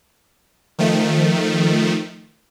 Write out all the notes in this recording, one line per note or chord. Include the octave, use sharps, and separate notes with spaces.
D#3 F3 A3